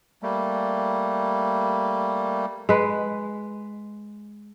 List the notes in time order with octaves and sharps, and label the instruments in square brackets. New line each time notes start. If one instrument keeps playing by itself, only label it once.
[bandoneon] G3 A3 A#3
[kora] G#3 B4